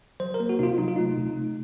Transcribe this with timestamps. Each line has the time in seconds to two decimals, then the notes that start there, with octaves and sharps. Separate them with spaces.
0.20 F#3 C5
0.34 A#4
0.40 A#3
0.49 F#4
0.59 C3 D#4 F4
0.78 F#3 D#4
0.88 F4
0.96 A3 D#4
1.18 C3
1.37 A3